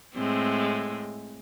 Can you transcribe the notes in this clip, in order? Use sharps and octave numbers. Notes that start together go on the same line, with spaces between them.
A2 G#3 C4